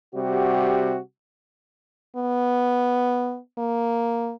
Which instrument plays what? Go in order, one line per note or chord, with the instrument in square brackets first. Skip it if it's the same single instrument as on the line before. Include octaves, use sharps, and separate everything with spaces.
[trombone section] C3 G3 F#4
[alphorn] B3
A#3